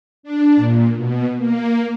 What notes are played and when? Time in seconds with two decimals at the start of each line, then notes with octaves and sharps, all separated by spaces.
0.23 D4
0.56 A#2
0.95 B2
1.37 A#3